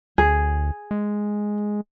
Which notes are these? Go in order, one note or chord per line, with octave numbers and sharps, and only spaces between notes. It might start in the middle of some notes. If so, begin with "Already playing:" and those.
D2 G#4
G#3